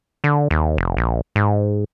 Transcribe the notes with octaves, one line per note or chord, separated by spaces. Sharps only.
D3
D#2
F1
A#1
G#2